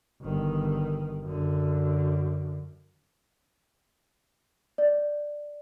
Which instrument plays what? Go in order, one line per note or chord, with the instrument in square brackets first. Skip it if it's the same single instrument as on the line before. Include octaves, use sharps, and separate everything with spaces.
[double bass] G1 D#3
F#2 D3
[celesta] D5